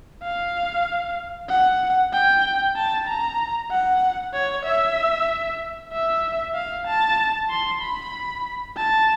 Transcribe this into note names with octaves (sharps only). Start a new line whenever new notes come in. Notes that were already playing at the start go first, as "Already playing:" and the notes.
F5
F#5
G5
A5
A#5
F#5
C#5
E5
E5
F5
A5
C6
B5
A5